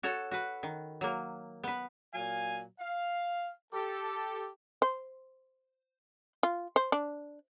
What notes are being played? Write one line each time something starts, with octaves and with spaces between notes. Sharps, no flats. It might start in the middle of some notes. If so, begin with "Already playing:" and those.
F#4 A4 C#5
F#4 B4
D#3
F#3 A#3
B3 B4
A#2 F#3 F5 G#5
F5
G4 A4
C5
F4
C5
D4